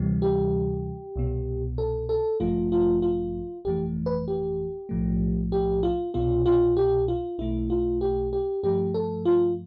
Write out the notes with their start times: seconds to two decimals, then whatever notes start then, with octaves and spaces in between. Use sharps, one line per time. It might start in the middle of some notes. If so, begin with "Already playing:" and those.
Already playing: D2 C3 E3 G3
0.22 G4
1.16 C2 B2 B3
1.78 A4
2.09 A4
2.40 A1 G2 F3 A3 F4
2.72 F4
3.02 F4
3.65 G1 F2 E3 A3 G4
4.06 B4
4.28 G4
4.89 B1 A2 F3 A3
5.52 G4
5.83 F4
6.14 C2 B2 B3 F4
6.46 F4
6.77 G4
7.08 F4
7.38 B1 B2 A3 E4
7.70 F4
8.01 G4
8.33 G4
8.63 G2 F3 A3 G4
8.94 A4
9.25 F4